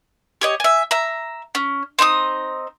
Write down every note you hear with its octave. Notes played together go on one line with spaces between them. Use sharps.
G4 C#5 D#5
E5 G#5
E5 A#5
C#4
C4 D#4 C6 D#6